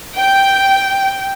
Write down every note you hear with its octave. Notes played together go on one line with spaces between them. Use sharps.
G5